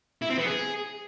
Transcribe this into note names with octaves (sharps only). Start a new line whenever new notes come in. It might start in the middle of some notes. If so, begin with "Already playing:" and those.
E4
C4
B3
G#4